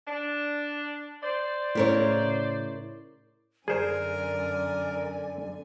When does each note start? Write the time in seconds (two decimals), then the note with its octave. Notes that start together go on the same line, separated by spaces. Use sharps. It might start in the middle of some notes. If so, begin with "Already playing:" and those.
0.07 D4
1.22 C5 D5
1.75 A2 C#3 E4 A#4 C#5
3.68 F#2 D3 G#4 A#4 C5 D5 G#5